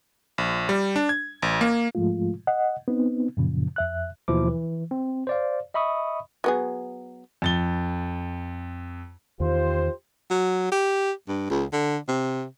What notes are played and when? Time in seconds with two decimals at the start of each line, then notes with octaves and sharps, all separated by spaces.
0.38 A#1
0.69 G3
0.96 D4
1.09 G#6
1.42 A1
1.61 A#3
1.95 G#2 F3 G#3 A3 F4
2.47 D#5 F#5
2.88 B3 C4 D#4
3.37 F#2 A#2 C#3 F3
3.76 F2 E5 F#6
4.28 D#2 B2 E3 F3 E4 D6
4.48 E3
4.91 C4
5.27 C5 D5 F5
5.74 D#5 E5 B5 C#6 D#6
6.44 F#3 B3 G#4
7.42 F2 A6 G7
9.40 E2 D#3 F4 G4 C5
10.30 F#3
10.72 G4
11.28 G2
11.50 C#2
11.73 D3
12.08 C3